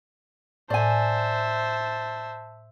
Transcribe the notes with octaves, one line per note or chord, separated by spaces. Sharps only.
A2 C5 D5 E5 G#5 A5